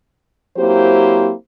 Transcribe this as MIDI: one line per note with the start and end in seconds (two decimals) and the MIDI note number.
0.57 1.32 54
0.57 1.32 58
0.57 1.32 60
0.57 1.32 64
0.57 1.32 67
0.57 1.32 72